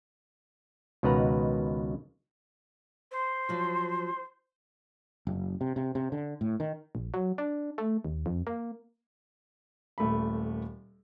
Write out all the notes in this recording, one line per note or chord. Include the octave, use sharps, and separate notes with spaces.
C#2 B2 D#3 B4 F#5 A#5
C5
F3 F#3
F#1
C3
C3
C3
D3
A2
D#3
A#1
F#3
D4
A3
D#2
F2
A#3
D#1 A3 A#3 B5